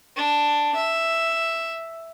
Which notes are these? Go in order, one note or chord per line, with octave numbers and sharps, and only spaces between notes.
D4
E5